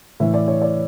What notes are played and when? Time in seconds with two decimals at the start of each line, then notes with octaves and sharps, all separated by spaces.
0.20 A2 E3 E5
0.34 D5
0.48 C#5
0.62 D5